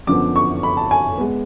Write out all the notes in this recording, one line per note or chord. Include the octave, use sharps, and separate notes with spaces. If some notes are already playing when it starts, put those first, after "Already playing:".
F#2 D3 F3 B3 D6
C#6
B5
A5
G#5
G#3 B3